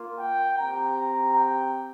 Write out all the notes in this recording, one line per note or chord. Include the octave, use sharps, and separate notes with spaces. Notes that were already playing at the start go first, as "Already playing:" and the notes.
Already playing: A#3 F4
G5
C4 G4 A#5
G5